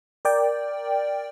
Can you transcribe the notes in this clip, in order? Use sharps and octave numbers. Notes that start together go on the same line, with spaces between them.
A#4 D5 G5